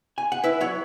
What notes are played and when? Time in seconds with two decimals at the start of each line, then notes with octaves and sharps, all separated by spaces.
0.18 G#5
0.32 F#5
0.44 E4 B4 E5
0.61 F#3 C#5 F#5